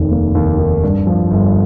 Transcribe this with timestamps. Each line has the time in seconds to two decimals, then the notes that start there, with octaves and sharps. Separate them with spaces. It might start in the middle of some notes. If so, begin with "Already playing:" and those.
Already playing: F1 D#2 D#3
0.11 A#3
0.35 D#2
0.59 D#3
0.83 G2
1.07 F3
1.31 G1